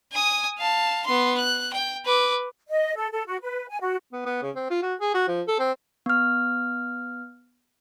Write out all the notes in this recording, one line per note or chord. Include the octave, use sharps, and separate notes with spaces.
G#5 D#6
F5 A5
B3 C6
F#6
G5
B4 D6
D#5
A4
A4
F#4
B4
G#5
F#4
B3
B3
C#3
C4
F4
F#4
G#4
F#4
F3
A4
C4
B3 F6